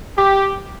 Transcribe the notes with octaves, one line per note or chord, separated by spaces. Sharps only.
G4